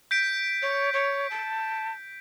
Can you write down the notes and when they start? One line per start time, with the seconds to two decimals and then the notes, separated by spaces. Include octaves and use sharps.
0.11 G6 B6 D7
0.62 C#5
0.93 C#5
1.31 A5